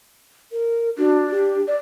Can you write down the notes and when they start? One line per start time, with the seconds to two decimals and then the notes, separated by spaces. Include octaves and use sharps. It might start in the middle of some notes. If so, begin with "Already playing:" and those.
0.52 A#4
0.98 D4 F#4
1.31 G4
1.68 D5